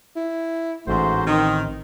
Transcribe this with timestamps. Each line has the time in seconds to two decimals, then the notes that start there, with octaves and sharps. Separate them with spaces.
0.16 E4
0.87 A1 G#2 A3 F#4 C5
1.26 D#3 C4